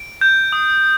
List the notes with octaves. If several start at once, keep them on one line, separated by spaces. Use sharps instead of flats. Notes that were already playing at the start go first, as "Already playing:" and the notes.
Already playing: D7
G6
D#6